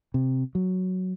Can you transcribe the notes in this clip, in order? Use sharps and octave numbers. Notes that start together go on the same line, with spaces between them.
C3
F#3